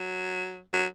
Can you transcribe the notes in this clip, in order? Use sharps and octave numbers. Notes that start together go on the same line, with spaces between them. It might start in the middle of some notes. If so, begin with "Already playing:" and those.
Already playing: F#3
F#3